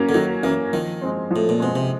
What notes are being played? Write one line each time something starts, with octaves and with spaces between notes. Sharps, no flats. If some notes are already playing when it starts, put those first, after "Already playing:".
Already playing: F#3 A#3 C#4
D3
D#3 F#3
E3 A#3 C#4
D#3 F3
G#3 C4
F3
A2
A#2
B2 G#3 C4
C3